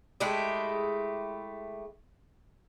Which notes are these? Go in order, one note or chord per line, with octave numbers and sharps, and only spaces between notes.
G#3 A3 E4 G4